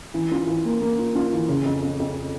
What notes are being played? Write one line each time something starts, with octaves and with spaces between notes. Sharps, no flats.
E3
F4
E3
A#3
A#3
F4
F4
E3
C#3
F2
F2
F2